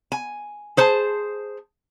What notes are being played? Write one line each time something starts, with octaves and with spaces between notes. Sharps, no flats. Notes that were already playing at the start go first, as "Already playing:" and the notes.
G#5
G#4 C5 A5